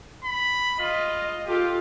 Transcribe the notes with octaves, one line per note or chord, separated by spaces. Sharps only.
B5
F4 D#5
F4 G4 A4